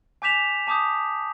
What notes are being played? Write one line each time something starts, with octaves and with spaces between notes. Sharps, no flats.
G#5 D6 G6 B6 E7 F7
A5 D6 D#6 G6